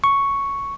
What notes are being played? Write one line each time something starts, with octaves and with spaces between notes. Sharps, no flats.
C#6